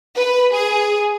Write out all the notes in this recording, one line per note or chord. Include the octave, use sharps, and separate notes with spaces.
B4
G#4